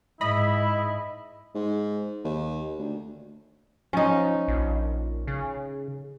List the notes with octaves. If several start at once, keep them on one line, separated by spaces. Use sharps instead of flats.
G#2 E4 D#5 B5
G#2
D#2
D2
F3 C#4 D#4
A#1
C#3